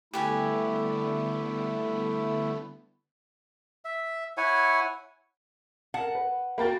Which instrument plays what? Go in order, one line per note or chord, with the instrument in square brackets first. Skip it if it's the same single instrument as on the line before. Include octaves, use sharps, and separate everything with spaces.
[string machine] D3 G3 B3 [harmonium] A3 E4 [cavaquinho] G4 B4 G#5
[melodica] E5
E4 C#5 F#5 G#5
[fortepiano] A#4 A5 [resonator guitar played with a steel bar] F#5
[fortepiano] B4
[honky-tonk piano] A#3 A#4 A6 [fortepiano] F#4 G5 B5